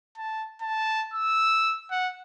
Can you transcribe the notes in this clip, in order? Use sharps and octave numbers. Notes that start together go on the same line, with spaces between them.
A5
A5
E6
F#5